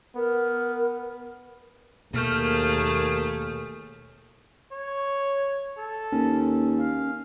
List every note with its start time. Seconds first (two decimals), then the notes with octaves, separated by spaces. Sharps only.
0.16 B3 A#4
2.14 D#2 B2 A3 A#3 G#4 F6 G6
4.73 C#5
5.78 A4
6.12 D#2 C#4
6.79 F5